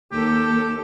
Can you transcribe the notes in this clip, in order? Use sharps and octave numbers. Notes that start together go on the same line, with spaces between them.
D#2 G4 A4